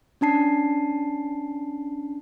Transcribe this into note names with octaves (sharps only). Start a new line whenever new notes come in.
C#4 D4 A5 C7